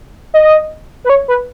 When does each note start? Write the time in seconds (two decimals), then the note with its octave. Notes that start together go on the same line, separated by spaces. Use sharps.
0.34 D#5
1.04 B4
1.09 C#5
1.28 B4